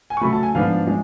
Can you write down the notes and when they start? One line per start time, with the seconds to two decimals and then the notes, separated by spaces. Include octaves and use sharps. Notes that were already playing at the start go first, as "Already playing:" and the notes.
0.10 G#5
0.17 C#6
0.21 C#3 F#3 A3 B5
0.33 A5
0.43 G#5
0.54 G#2 F3 B3 D4 F5
0.87 G#3